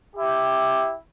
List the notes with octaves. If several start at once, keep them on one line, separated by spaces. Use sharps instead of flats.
E4 G4